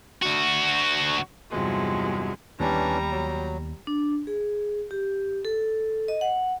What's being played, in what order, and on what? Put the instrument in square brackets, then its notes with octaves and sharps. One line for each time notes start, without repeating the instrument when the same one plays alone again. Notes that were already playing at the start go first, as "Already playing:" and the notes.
[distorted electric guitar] D2 F#4
[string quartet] E2 G2 C3 F3 F#3 G#3
[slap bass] D#2 B3 [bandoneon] E3 C#4 D4 [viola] G3 A#5
[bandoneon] F#3
[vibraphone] D4
G#4
G4
A4
D#5
F#5